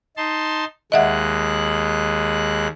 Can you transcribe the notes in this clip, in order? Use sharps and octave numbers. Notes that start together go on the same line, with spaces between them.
D#4 A5 C6
D#2 G#3 D#5 E5 F#5 F#6